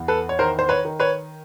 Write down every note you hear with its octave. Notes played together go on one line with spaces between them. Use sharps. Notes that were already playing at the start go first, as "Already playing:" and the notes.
Already playing: E2
A4 B4
C#5
D#3 A#4 C5
C5
B4 C#5
D#3
B4 C#5